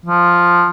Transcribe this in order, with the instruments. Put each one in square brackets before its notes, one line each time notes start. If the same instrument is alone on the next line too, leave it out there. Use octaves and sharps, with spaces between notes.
[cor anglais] F3